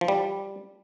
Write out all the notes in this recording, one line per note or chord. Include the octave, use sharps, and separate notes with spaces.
F3
G3